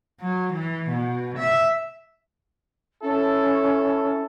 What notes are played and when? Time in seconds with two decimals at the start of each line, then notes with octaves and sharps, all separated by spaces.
0.21 F#3
0.53 E3
0.90 B2
1.38 E5
3.03 C#4 E4 A4